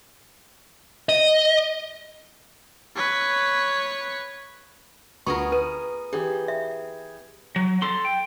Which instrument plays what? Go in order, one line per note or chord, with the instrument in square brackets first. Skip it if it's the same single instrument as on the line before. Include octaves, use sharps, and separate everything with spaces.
[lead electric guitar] D#5
[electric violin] B4 C#5
[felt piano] D2 [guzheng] B3 G#4 A#4 [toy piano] F4 C#6
[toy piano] B4 [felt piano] D#7
[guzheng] E3 [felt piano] G4 G#4
[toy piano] E5
[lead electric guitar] F#3
A4 C6
G5